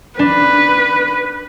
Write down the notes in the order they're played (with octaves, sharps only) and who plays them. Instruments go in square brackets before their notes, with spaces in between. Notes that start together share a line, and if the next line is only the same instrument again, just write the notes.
[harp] D4 [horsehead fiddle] B4